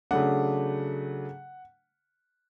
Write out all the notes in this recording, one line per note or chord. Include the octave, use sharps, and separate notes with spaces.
C#3 F#3 A3 D4 F#5